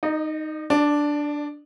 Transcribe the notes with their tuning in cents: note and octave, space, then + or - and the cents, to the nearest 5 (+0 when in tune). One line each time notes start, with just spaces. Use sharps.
D#4 +0 D#5 -40
D4 +0 D5 +25